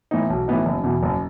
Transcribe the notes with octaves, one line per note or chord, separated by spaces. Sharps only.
A2 E3 B3 D#4
B1
A2 E3 B3 D#4
F#1
E2 B2
F#1